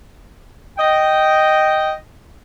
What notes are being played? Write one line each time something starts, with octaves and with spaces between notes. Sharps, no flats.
D#5 G5